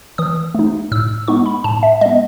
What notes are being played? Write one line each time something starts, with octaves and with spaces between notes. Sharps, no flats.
E3 D#6
A3 D#4
A2 E6
G#3 B3 D#4 C#6
B5
A2 A5
E5
G#3 B3 D#5